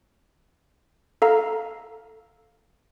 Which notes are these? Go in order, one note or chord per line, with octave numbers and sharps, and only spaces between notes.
A4 F5 A#5